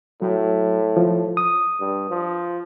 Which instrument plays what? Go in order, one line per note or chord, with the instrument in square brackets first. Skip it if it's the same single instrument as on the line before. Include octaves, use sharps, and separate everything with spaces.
[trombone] A2 [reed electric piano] F#3
[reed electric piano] F3
D#6
[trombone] G2
F3